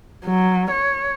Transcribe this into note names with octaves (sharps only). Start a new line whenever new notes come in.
F#3
C#5